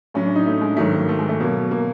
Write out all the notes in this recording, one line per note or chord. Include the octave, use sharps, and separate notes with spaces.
A2 F#3 C#4
D4
D#4
A3
G#3
G#2 D#3 F#3 A3
A#3
A3
G#3
A3
B2 F#3 A#3
A#3